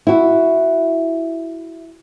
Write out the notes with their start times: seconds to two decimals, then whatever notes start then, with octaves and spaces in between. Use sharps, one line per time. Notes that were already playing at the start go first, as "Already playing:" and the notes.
0.07 E4 F#4